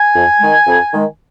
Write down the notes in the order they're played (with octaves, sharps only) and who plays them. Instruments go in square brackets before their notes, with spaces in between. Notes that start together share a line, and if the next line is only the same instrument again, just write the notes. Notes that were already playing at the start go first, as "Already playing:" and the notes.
Already playing: [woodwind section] G#5
F2
D#3 G#3
F2
D#3 G#3